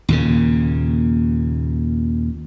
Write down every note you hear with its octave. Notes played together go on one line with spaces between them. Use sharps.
D#2 A#2 C#3